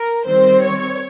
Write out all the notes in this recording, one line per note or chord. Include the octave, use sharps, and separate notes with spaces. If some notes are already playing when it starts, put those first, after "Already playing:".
Already playing: A#4
D#3 G3 C4 C5
C#5